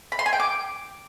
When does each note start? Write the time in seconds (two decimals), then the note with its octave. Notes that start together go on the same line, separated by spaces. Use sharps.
0.12 B5
0.19 C6
0.26 G#5
0.33 G5
0.40 D6